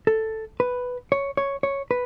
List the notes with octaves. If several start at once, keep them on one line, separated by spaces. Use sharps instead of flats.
A4
B4
C#5
C#5
C#5
B4